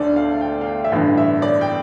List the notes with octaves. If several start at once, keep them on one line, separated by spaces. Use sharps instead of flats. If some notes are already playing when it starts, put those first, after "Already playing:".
Already playing: D2 D3 A3 D5
F5
G5
F5
G5
E5
A1 G2 D3 F5
E5
D5
G5